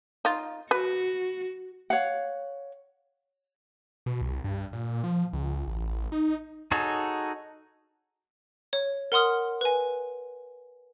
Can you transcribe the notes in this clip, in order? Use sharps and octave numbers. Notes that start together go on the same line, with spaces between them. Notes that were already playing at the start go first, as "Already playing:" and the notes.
D#4 F4
F#4 B4
C#5 F5 F#5
B2
C2
G2
A#2
F3
C#2
A1
D#4
D#4 F#4 G#4 A4 C#5
C#5
A#4 F#5 C6 D#6 F6
B4 G#5